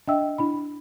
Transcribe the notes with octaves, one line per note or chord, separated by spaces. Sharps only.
D4 D#5 E5 G5 E6
D4 E4 B5